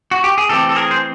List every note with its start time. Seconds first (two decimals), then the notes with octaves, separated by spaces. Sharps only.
0.11 F#4
0.24 G4
0.38 G#4
0.49 E3 A3 C4 G4 A4
0.69 A4
0.76 G#4 A#4
0.91 C5